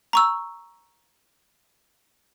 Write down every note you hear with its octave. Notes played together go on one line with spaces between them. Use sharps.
A#5 C#6 E6